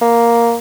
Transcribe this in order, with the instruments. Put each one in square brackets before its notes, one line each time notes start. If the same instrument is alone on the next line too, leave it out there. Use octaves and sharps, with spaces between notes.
[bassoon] A#3